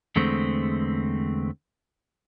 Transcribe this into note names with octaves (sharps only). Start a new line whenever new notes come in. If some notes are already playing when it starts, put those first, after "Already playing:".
E2 D3 G#3 A3 C4